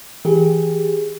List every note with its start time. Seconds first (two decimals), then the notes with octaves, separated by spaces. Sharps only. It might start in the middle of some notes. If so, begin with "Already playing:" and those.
0.25 E3 G4 G#4